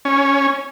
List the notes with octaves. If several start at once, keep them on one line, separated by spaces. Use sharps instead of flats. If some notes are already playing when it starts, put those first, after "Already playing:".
C#4